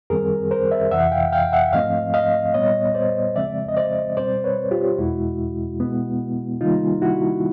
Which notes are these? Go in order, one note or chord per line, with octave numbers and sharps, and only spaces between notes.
F#2 D#3 G3 C4 G#4 A#4
A#4 C5
D5 E5
F2 C3 E3 E5 F#5
F5 G5
F5 G5
E5 F#5
G#2 F3 A3 C4 D#5 F5
D#5 F5
A#2 G3 B3 C#5 D#5
C5 D5
C#3 F3 G#3 C4 D5 E5
D#5
C5 D5
B2 G3 C4 C5 D5
B4 C#5
F4 G4
E2 B2 G#3 E4 F#4
B2 G#3 B3
C3 D#3 G3 A#3 D#4 F4
E4 F#4